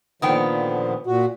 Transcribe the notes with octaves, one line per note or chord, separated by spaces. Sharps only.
A#2 D3 D#3 F3 B3 G5
A#2 F#4